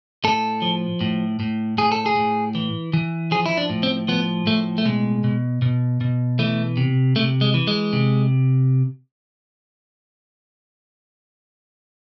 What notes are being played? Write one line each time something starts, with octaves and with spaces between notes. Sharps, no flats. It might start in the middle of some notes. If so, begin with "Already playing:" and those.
A2 A4
F3
A2
A2
A2 G#4
A4
G#4
A2
E3
E3
F3 G#4
E4
D4
A2
C4
F3 B3
A2 A3
A3
B2 G#3
B2
B2
B2
E3 A3
C3
C3 A3
G#3
E3
G#3
C3